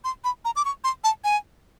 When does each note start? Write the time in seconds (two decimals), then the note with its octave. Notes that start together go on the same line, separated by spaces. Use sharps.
0.04 C6
0.24 B5
0.45 A#5
0.56 D6
0.65 C#6
0.84 C6
1.04 A5
1.24 G#5